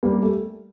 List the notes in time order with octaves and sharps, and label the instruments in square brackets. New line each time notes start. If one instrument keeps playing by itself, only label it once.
[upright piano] G3 A#3
A3